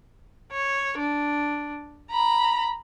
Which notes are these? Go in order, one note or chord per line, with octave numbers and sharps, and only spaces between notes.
C#5
D4
A#5 B5